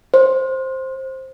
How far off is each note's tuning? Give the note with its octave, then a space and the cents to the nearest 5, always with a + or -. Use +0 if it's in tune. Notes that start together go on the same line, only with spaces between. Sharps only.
C5 +10